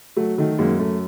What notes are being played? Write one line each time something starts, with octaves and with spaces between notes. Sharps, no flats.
F#3 A3
D#3 A3
F#2 G#3 A#3
F#2 A3